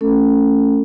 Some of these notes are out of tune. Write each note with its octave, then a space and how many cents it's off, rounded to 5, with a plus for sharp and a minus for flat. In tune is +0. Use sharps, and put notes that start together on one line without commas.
A3 +0 C#4 +0 A4 +25